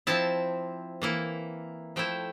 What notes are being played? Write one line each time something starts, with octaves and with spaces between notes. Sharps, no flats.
F3 C4 E4 A5
E3 A#3 E4
F3 A3 E4 G5